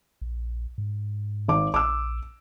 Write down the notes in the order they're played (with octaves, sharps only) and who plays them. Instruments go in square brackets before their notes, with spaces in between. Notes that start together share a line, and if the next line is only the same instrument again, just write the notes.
[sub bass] A#1
G#2
[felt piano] G#1 D6
[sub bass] A#1 [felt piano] D6 E6